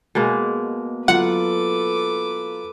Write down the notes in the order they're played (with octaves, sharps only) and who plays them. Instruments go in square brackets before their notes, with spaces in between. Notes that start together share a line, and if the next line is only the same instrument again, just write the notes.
[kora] B2 G#3 A#3
[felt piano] F#3 F4 [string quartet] A4 B4 D6 [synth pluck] F#5